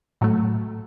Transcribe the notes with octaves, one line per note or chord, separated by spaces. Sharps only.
A2 F#3 A3